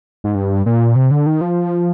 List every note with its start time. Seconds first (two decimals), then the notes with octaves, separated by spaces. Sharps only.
0.24 G#2
0.35 G2
0.66 A#2
0.96 C3
1.11 D3
1.26 D#3
1.41 F3